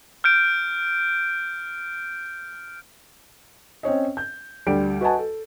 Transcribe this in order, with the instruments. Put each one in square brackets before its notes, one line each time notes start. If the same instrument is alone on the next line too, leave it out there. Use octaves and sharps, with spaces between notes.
[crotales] F6 G6 D7
[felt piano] C4 C#4 C#5 D#5
G6
D2 G3 D7
F#4 B4 D#5 F#5 G#5 A5
A4